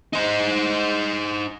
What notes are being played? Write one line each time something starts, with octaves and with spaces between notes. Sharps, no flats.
D#4 C5